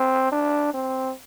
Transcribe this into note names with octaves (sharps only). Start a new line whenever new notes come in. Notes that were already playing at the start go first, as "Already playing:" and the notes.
Already playing: C4
D4
C4